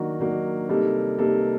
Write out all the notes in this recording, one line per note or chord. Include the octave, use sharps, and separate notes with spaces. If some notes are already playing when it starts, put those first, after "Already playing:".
Already playing: D#3 F#3 A#3 D4 F#4
D#3 F#3 A#3 D4 F#4
C3 G3 A#3 D#4 A4
C3 G3 A#3 D#4 A4